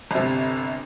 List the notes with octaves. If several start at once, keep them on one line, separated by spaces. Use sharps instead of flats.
G1 C3